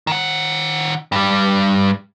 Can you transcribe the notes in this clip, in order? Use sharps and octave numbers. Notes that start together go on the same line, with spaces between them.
D#3 F#5
G2 G3